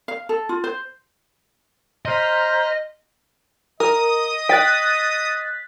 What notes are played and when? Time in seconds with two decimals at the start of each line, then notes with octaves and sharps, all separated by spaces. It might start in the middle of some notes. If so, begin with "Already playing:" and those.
0.08 F5
0.29 A4
0.49 F4
0.64 C5
2.06 C5 D#5 A#5 C6 F6 G6 B6
3.80 A#4 D#5 D#6
4.49 G5 F#6 A6 B6